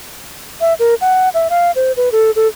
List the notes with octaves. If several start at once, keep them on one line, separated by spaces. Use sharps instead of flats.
E5
A#4
F#5
E5
F5
C5
B4
A4
A4